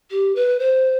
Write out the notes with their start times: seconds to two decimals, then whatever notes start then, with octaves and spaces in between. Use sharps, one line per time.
0.10 G4
0.35 B4
0.59 C5